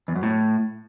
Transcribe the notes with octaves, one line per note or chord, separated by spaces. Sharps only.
E2
F#2
A2